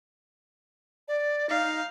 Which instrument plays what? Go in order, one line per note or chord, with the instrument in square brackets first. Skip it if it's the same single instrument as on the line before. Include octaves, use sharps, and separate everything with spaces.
[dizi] D5
[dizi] D#4 [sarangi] F5